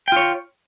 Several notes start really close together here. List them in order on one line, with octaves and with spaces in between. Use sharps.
G5 F4 C#5